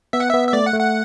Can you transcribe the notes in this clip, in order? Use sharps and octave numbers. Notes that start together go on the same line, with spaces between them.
B3 E5
F#5
B3 E5
E5
A3 D5
F#5
A3
F#5